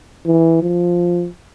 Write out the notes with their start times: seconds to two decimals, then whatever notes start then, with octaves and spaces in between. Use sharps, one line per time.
0.26 E3
0.62 F3